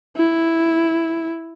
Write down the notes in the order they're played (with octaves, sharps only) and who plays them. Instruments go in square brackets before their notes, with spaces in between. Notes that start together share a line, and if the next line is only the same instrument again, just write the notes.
[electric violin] E4